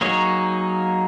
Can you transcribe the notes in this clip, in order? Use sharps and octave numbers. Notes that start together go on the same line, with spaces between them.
F#3 A#3 D#4 G#4 C#5